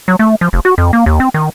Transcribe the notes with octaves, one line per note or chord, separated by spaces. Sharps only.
F#3
A3
F3
F1
F#4
F2
A#3
D#2
C4
D#3